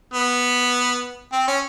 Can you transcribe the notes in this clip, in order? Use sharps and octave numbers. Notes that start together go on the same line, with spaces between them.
B3
C4
C#4